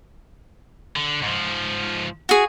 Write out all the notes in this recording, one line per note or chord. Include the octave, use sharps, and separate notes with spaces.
D3
G#2 F3
F#4 G#4